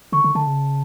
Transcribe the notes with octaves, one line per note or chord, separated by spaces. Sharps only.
D3 C#6
D3
D3 A5
C#3